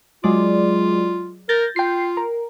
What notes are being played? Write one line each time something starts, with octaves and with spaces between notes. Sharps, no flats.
F#3 G#3 F4 D5
A#4 G6 A6 A#6
F4 G5 C7
A#4